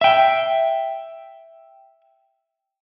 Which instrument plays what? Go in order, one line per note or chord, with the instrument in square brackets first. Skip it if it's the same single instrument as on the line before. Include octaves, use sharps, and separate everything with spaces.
[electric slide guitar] E5 G5